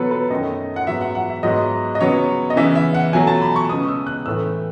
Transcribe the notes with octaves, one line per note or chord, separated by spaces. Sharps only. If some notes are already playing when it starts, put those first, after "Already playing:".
Already playing: B2 F#3 B3 A4 B4 C#5
B4
F#2 D#3 A3 D#5
F#5
G#2 F#3 B3 E5
F#5
F#5
E5
G#2 F#3 B3 D#5
D#5
C#3 F#3 B3 C#5
D#5
C#3 E3 B3 E5
E5
F#5
B2 F#3 A3 G#5
A5
B5
C#6
C#3 G#3 B3 D#6
E6
F#6
A2 E3 A3 E6